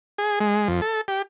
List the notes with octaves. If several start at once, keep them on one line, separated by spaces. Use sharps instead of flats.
G#4
G#3
F2
A4
G4